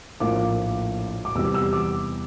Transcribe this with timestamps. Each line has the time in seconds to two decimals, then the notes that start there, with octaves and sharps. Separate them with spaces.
0.20 A#1 A2 F3 A#3 D6
1.25 D6
1.35 E2 C3 G3 E6
1.54 E6
1.73 D6